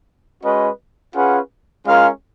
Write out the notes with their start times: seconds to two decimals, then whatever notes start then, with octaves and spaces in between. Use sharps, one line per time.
0.43 G#3 C#4 F#4 B4 D#5
1.14 C#4 F4 G#4 B4 F#5
1.85 G#3 C#4 F4 A#4 F5